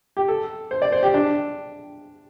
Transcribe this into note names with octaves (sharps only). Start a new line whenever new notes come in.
G4
A4
C5
D5
C5
G4
D4